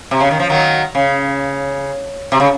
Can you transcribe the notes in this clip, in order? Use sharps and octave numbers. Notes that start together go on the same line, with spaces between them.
C3
C#3
D#3
F3
D#3 F#3
C#3
C3
C#3